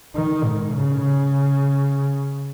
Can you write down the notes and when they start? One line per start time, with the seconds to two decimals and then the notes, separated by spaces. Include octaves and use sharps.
0.15 D#3
0.44 G#2
0.73 C#3
1.02 C#3